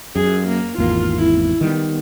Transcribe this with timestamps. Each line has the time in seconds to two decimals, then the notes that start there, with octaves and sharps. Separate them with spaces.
0.16 F#2 G#4
0.48 A#3
0.78 G#1 E2 A#3 F4
1.18 E4
1.61 D#3 G3 B3